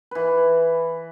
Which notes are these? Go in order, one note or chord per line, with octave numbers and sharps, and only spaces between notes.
E3 B4